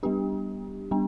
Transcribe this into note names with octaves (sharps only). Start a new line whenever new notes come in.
G3 B3 D4 G4
G3 B3 D4